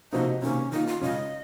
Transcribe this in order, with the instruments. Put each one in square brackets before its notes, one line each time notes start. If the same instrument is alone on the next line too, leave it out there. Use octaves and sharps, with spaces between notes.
[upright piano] C3 F3 A#3 D#4 F#4 [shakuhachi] D#5
[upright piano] C3 D#3 A#3 [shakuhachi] C#4
[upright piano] D#3 A#3 F4 [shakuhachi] D#4
[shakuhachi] F4
[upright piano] C#3 G#3 C#4 F4 [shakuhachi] D#5